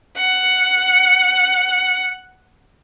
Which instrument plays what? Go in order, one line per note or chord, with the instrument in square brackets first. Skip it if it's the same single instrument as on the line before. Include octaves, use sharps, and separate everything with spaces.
[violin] F#5 C#7